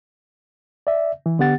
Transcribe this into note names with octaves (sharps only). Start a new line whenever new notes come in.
D5 E5
E3
D3 B3 G4 F#5 A6